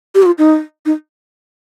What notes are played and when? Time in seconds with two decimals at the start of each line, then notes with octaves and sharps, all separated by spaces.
0.15 G4
0.23 F#4
0.26 F4
0.38 D#4
0.86 D#4